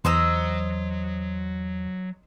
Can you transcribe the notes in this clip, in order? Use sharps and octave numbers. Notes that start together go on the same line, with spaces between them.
E2 F#3 C5 D#5 A#5 E6